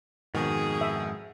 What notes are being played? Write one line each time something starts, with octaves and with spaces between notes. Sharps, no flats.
F2 G#2 B2 D#3 G#4
E5